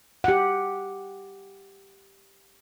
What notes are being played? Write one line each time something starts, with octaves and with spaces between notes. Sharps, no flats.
G4 F#5